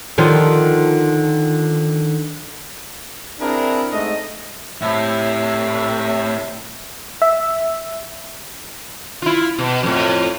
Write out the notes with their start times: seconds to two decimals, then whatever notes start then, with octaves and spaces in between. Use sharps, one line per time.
0.18 D3 D#3 F3
3.41 C4 D4 E4 G#4 A#4
3.92 G#2 A3 D#5
4.82 A2 C3 E5
7.22 E5
9.22 E4 F4
9.58 B2
9.83 F2 A2